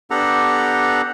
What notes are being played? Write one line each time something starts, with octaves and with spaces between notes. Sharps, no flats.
B3 D4 G4 A4 F#5 A#5